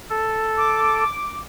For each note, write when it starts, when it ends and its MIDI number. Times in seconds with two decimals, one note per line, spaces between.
0.10 1.04 69
0.58 1.40 86